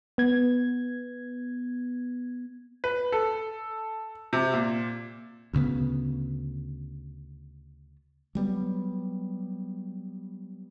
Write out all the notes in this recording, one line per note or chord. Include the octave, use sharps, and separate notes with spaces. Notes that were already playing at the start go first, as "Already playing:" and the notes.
B3 G#6
B4
A4
C3
A#2
D2 C#3 B3
F#3 G3 B3